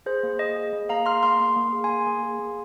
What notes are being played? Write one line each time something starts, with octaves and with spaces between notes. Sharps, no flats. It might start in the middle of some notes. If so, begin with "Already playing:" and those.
G#4 C5
A#3
G#4 D#5
G#4
A#3
A#3 F5 A#5
G#4 C6 F6
A#3 C6 F6
A#3 C6 F6
A#3
G#4
G#5 C6
A#3
A#3
G#4
A#3